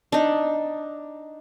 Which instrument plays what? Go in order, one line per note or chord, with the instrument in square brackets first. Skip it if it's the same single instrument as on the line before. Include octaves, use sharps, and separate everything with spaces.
[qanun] D4 D#4